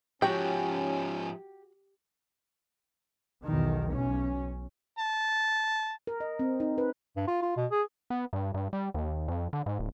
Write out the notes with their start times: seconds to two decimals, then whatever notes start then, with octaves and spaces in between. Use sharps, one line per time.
0.22 G#2 F3 C#4 F#4 G4 F#5 G5
3.44 B1 E2 D#3
3.91 B1 C#4
4.99 A5
6.07 A#4
6.20 D#5
6.39 C4
6.60 D#4
6.78 B4
7.16 G2
7.28 F4
7.42 F4
7.57 B2
7.71 G#4
8.10 B3
8.33 G2
8.54 G2
8.73 G3
8.94 D#2
9.28 F2
9.53 D3
9.66 G#2
9.79 D1